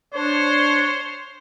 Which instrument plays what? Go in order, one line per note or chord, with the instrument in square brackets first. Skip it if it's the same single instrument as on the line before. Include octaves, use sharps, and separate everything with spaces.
[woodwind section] D4 [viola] C5 [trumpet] C#5